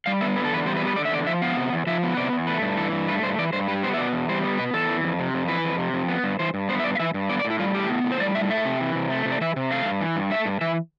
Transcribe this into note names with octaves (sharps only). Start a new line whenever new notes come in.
G3 F5
B3 E5
D3 B4
A4
E2 B4
G3 C5
B4
B3
B4
D3 D5
E5
E2 D5
F3 E5
B3 F5
C3
E2
F3 E5
B3
C3 D5
E2
A3 B4
G2
E3 A4
G2
A3 B4
G2 C5
E3 D5
G2 C5
G3 B4
B3 C5
E5
B2 D5
E2
G3 C5
B3
B2 B4
E2 A4
E3
F2
C3
F2
E3 B4
F2
C3
F2
B3
G2
E3 C5
G2
B3 C5
E5
G2 D5
F5
E3 E5
G2
B3 D5
D5
A2
E4
G3 F4
A2 G4
B3
A2
C5
G3 D5
A2 E5
A3 E5
C3
E3
C3
A3
C3
D5
E3 E5
C3
A3 F5
G2
E3
G2
A3 E5
G2
E3 E5